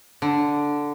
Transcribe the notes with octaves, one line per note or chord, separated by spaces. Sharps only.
D3